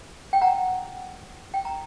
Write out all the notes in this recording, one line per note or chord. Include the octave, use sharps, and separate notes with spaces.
G5
F#5 A#5
G5
A#5